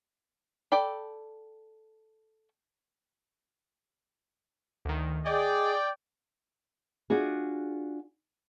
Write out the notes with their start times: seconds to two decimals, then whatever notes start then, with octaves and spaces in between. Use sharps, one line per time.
0.72 A4 D5 G5 B5
4.85 D2 D#3
5.26 G#4 D5 D#5 G5
7.10 D4 F4 F#4 G#4